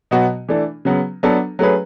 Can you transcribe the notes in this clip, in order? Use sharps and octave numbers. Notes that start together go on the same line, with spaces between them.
B2 F#3 B3 F#4
E3 A3 D4
C#3 F#3 B3
F#3 B3 D4 A4
F#3 A3 C#4 G#4 B4